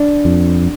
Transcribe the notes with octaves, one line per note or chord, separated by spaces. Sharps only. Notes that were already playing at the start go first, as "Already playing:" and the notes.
Already playing: D4
F2